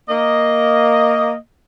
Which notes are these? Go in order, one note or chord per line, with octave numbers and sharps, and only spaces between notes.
A#3 D#5